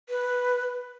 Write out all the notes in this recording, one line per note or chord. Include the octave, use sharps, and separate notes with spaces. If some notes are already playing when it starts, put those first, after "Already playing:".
B4